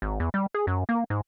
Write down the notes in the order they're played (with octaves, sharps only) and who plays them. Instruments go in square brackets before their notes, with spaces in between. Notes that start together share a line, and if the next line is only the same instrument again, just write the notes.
[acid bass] G#1
E2
G3
G#4
F#2
A#3
G#2